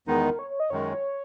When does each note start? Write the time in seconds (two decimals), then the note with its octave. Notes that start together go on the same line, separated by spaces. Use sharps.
0.07 E2 D#3 G#3 B3 D#4 A#4
0.23 A#4
0.39 C#5
0.50 C#5
0.60 D#5
0.70 F#2 D#3 G#3 C#5